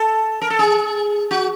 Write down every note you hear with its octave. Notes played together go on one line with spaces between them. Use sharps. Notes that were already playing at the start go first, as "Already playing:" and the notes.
Already playing: A4
A#4
A4
G#4
F#4